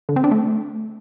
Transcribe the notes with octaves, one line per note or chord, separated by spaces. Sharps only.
D3
C4
D4
A3